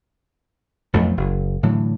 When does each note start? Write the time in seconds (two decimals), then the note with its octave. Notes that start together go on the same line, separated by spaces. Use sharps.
0.93 B1 F2 A3
1.17 F#1
1.63 A2 D3 E3 F#3